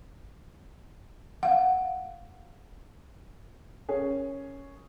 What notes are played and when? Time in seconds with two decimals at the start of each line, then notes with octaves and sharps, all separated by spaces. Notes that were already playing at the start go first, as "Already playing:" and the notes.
1.43 F5 F#5
3.88 C#4 G#4 A#4